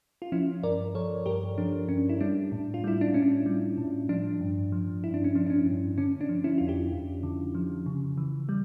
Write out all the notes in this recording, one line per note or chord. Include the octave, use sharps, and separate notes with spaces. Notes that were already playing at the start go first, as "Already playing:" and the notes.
F4
F3 C#4 E4
G2 A#4 D5
F3 A4 C#5
G2 G4 A#4
F3 D4
G2 C#4
E4
G3 D4
A2
F4
G3 E4
D4
A2 C#4
G3
A2
F3 D4
G2
F3
G2 E4
D4
C#4
F3 D4
D4
C#4
G2
D3 C#4
D4
F3
C#4 E4
F2 F4
E4 G4
F2
D3
F3
C#3
E3
G3